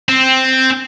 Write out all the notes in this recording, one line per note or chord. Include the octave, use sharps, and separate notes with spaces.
C4